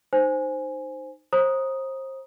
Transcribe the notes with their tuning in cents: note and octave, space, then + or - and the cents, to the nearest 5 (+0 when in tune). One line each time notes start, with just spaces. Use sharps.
D#4 -15 C5 +0 G#5 +0
C5 +30 A#5 +20 D#6 +0